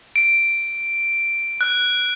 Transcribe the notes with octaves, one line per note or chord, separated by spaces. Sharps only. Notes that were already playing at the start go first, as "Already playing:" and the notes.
D7
F#6